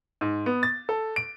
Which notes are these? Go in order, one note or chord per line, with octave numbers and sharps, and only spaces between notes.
G#2
B3
A6
A4
D7